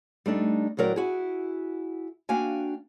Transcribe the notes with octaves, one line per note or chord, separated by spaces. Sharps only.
G3 A3 D4 D#4
D2 A2 F#3 A#4 D5 G5
E4 F#4 G#4
A#3 D4 F#4 F5 G5 G#5